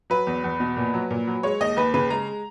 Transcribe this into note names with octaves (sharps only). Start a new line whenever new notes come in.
F#3 B4
E2
E2
B2
A#2
F#3
A#2
F#3
G#3 C#5
D#2 D#5
D#2 B4
C#3 B4
G#3 A#5